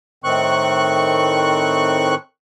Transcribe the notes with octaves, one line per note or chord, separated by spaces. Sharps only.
A2 D#3 C4 C#6 F#6